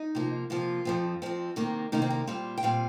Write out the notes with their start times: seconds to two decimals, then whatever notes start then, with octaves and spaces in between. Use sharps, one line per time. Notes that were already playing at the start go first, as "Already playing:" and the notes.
Already playing: D#4
0.15 C3 F3 A#3
0.50 C3 F3 A#3 F4
0.85 F2 F3 C4
1.22 F2 F3 C4
1.56 C3 D#3 A#3
1.92 C3 D#3 A#3 D#4
2.02 C4
2.10 D#4
2.27 A#2 G3 C4 F5
2.58 G5
2.63 A#2 G3 C4 F5